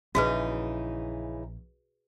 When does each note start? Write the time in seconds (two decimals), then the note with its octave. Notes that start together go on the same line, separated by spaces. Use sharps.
0.15 A#1 C#3 E3 D#4 F#4 G#4 B4